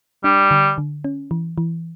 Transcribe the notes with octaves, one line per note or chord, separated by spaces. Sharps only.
G3 D4
D3
D3
C#4
E3
E3